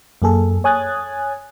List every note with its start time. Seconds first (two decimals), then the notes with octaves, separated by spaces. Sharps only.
0.22 F#2 A#3 G#4 A4
0.64 C#5 G#5 D#6 F#6 G#6 A6